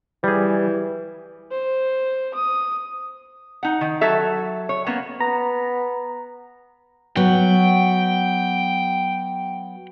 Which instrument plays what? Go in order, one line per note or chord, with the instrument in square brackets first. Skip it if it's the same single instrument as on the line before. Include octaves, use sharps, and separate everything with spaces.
[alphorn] E3 [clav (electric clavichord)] G3 G#4
[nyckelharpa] C5
D#6
[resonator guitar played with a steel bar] D#4 F#5
D#3
F#3 A4 E5
C#5
A#3 B3 C#4
[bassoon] B3 [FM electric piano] A#5
[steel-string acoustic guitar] F#3 B3 F#4 [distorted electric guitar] G5